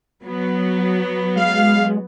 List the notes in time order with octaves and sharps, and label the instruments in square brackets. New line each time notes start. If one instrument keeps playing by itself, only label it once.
[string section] F#3 B3
[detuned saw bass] G#3 [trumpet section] F5